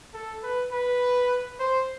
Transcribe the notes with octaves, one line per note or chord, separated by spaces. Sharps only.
A4
B4
B4
C5